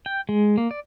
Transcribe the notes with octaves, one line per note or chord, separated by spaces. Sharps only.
G5
G#3
A#3
D5